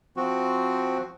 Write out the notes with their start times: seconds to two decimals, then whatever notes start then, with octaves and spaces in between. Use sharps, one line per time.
0.17 F3 C4 F#4